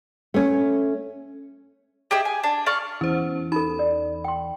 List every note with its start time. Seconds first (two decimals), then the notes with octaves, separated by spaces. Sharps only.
0.34 A3 C#4
2.11 G4 G#4 D#5 E5
2.25 G#5
2.43 D4
2.66 D5 F5 C#6
3.01 E2 C#4 C5
3.52 D#4 A4 B5
3.79 D5
4.24 G5 C6